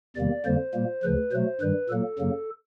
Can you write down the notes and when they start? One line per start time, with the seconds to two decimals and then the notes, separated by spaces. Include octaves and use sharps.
0.16 E2 C3 D#3 G3 A#3 D5
0.45 F2 D3 G3 A#3 C5
0.74 A#2 G3 A#3
1.03 D2 C#3 F3 B4
1.32 B2 F#3 A3 C5
1.61 G2 D#3 G3 B4
1.90 A#2 F#3 A#3 A4
2.18 F#2 C#3 F#3 A#3